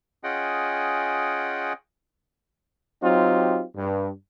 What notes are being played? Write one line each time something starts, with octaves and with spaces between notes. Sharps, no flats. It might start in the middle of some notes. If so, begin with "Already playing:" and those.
C#4 F4 G#4 D#5 F#5 G5
F#3 C4 D#4 F4 G4
G2